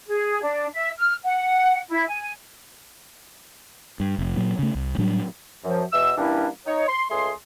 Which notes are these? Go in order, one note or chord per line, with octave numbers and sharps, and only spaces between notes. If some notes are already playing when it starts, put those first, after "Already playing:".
G#4
D4
E5
F6
F#5
E4
G#5
G2
F1
A#2 F#3
C#3 A3
C2
A2 F#3 G3 D4
F#2 F3
E2 B2 E5 E6
E3 G3 A#3 C#4 D4 E4
D#4 C#5
C6
C#2 A3 G#4 C6